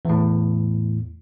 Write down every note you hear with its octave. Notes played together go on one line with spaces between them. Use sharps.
E2 A2